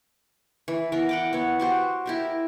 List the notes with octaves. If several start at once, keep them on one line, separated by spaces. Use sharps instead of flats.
E3
E3 B3 A#4
F#5 G5 D6
B3 C#5
F#4 G4 C5
E4 G4 A#4